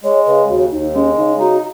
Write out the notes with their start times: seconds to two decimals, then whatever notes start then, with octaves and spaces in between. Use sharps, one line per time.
0.04 G#3 C#5
0.26 C#3 B4
0.49 D#2 F#4
0.71 D#2 D#4
0.94 G#3 C#4
1.17 C#3 D#4
1.39 D#4 F#4